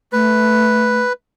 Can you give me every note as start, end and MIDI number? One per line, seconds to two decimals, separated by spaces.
0.13 0.98 57
0.13 1.13 71